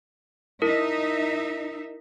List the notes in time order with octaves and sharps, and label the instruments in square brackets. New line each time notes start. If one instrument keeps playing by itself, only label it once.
[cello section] D#4 E5 [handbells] E4 A#4